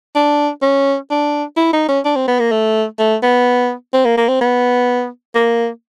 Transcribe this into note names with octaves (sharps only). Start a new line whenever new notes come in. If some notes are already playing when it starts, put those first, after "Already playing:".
D4
C#4
D4
E4
D#4
C#4
D4
C4
B3
A#3
A3
A3
B3
C4
A#3
A#3
C4
B3
A#3